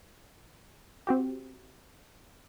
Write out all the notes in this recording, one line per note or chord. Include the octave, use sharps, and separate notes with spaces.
C4 F#4 G4